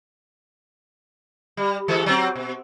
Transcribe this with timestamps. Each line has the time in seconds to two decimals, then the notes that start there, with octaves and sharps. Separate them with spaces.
1.57 G3
1.88 E3 G#3 A4
2.06 F#3 C4
2.36 B2